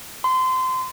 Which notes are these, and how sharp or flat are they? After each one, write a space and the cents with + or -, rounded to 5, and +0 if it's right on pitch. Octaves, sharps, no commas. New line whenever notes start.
C6 -25